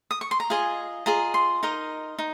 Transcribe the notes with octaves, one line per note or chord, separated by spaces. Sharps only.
D#6
C#6
C6
A#5
F4 G#4 D#5 G#5
F4 G#4 D#5 A#5
C6
D#4 A#4 D#5
D#4